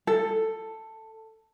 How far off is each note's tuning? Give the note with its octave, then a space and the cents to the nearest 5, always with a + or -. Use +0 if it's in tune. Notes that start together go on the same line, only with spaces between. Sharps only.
A4 +10